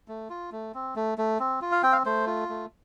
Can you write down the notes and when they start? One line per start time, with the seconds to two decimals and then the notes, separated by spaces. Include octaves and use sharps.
0.08 A3
0.30 F4
0.52 A3
0.74 C4
0.96 A3
1.18 A3
1.40 C4
1.61 F4
1.72 F5
1.83 C4 G5
1.92 F5
2.06 A3 C5
2.27 F4
2.49 A3